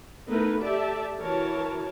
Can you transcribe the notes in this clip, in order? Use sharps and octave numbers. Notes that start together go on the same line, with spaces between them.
A3 B3 D#4 E4 A#4 B4
G4 A4 D5 E5 A5
E3 F#4 A#4 C#5 A5